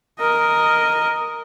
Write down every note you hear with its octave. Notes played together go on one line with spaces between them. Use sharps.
A#4 D#5